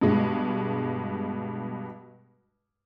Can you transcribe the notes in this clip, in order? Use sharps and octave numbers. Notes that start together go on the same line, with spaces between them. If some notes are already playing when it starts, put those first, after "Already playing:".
G2 B2 G#3